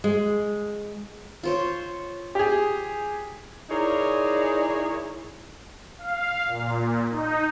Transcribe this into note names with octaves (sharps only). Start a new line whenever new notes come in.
G#3
F4 C5 C#5
G4 G#4
D#4 E4 G#4 A#4 C#5 D5
F5
A#2
D#4